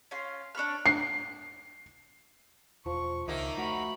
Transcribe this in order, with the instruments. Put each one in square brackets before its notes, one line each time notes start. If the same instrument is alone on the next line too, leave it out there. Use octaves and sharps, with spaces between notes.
[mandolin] C#4 F4 F5 C6
D4 C#5 B5 F6
[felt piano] C7
[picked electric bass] E1 [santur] F3 [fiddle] C#6
[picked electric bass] C#2 [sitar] D#3 A#3 [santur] C5 C#5 [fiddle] E5
[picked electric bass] A3 [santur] F#4 E5 [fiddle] B5 C#6